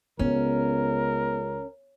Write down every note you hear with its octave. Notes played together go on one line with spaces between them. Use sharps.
C#2 B3 C#4 A#4